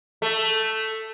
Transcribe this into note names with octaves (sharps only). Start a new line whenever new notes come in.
A3